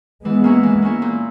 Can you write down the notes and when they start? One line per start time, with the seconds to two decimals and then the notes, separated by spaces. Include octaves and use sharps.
0.25 E3 G#3 B3
0.44 A#3 C#4 E4
0.63 E3
0.82 A#3 C#4 E4
1.02 A#2